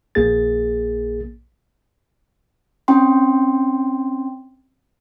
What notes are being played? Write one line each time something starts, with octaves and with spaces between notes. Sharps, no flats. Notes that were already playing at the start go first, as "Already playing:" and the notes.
A#1 A#3 G#4 A6
C4 C#4 G5 C6